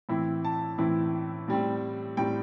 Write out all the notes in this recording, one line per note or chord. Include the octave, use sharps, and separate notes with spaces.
A2 E3 C4 E4
A5
A2 E3 C4 E4
A2 G3 C4
A2 G3 C4 G5